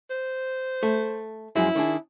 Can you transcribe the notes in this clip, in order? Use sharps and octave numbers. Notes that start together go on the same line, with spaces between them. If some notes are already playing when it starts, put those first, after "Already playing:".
C5
A3
F#2 F3 G#3 E4
D#3 D4 G#4